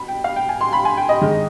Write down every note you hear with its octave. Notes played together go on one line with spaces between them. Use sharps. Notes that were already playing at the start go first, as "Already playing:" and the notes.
Already playing: B2 B5
G5
F5
G5
G#5
C6
B5
G#5
G5
D#5
G#2 D#3 G#3